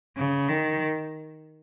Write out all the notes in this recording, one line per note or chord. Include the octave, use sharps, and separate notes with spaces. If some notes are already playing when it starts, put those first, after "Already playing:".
C#3
D#3